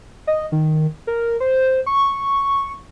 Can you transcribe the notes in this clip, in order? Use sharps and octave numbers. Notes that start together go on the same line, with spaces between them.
D#5
D#3
A#4
C5
C#6